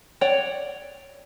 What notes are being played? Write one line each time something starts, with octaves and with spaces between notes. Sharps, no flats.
C#5 D5 F#5 G5